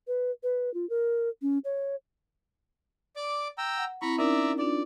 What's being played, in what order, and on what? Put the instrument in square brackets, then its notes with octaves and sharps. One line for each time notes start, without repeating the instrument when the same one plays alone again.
[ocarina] B4
B4
F4
A#4
C#4
C#5
[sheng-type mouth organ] D5 D6
G5 A#5 E6
[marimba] F#5
[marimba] C4 E4 [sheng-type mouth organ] A#5 B5 C#6
[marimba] C#4 D#4 A#4 [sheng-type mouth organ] D5 E5 A#5
[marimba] D4 F4 [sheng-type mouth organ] D5